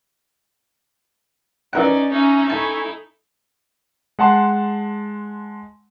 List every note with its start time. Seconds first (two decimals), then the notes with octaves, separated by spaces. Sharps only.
1.73 E3 C#4 D#4 A#4 D5 F#5
2.11 C#4 D#4 E5 A#5
2.50 E4 A4 G#5 A5 C#6
4.19 G#3 F#5 A5 C6